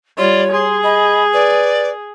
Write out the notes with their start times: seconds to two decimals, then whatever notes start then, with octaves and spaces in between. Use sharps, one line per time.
0.18 G3 F4 C#5 D5
0.52 G#4 C6
0.83 D#5 B5
1.33 B4 D5